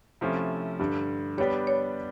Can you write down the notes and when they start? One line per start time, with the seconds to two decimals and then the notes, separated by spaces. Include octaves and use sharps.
0.21 C3 F3 A3 C#4 E4
0.80 G2 D3 G3
1.38 G3 B3 D4 G4 C#5
1.67 C#5